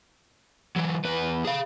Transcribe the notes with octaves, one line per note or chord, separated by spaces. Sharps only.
E3 F#3
E2 B4
G#4 F5